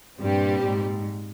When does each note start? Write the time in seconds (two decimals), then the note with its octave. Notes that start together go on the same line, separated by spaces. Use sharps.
0.20 G2 A#2 G3 C4 G4
0.64 G#2